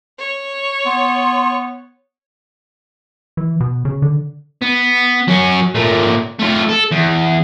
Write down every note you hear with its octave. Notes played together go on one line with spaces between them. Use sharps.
C#5
B3 C6
E3
B2
C#3
D3
B3
F#3 C#4
A#2 A3
A3 F4
A4
E2